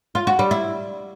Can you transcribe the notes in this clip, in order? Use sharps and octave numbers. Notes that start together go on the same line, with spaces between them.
F4
F#4
G3
E4